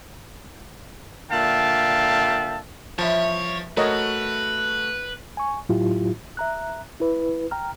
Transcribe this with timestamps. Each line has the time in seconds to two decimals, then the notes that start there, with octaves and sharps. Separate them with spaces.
1.31 A#2 D3 E5 F5 G5 A5
2.99 E2 G2 F3 C#5 E5 A5
3.77 A3 F#4 A#4 B4 C#5 D#5
5.37 G#5 C#6
5.69 A2 F#3 E4 F4 G4
6.37 E5 A#5 F#6
7.00 E4 B4
7.51 G5 A#5 F6